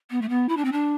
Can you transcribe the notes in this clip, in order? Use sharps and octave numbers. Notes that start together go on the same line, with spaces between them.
B3
A3
B3
E4
D4
C4
D4